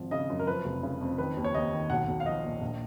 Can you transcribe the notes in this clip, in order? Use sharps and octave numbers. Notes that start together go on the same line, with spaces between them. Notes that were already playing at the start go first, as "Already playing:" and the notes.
Already playing: G#1 F3
C#3 D#5
F#2
A#4
F3 B4
F1
C#3
F2
D#3 B4
D#2
C#5
D#2 D#5
D#3
B1 F#5
B1
F5
F3 D#5
A#2
A#1